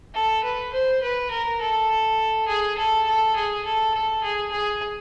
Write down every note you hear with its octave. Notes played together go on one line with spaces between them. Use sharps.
A4
B4
C5
B4
A#4
A4
G#4
A4
A4
G#4
A4
A4
G#4
G#4